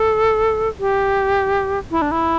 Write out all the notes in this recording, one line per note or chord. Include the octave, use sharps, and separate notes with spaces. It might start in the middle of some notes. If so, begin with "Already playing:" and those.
Already playing: A4
G4
E4
D4
E4